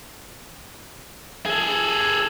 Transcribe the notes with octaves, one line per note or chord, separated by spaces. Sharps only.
G#4 A4